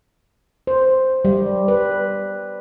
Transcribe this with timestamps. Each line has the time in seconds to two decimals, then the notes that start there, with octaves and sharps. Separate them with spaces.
0.67 C5
1.25 G3
1.68 B4